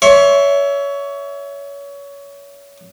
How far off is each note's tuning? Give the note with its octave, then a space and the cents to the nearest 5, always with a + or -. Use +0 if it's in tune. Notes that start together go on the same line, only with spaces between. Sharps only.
C#5 +25 E5 +0 C6 +45